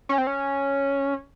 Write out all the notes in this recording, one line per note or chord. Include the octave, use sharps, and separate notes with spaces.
C#4
C4
C#4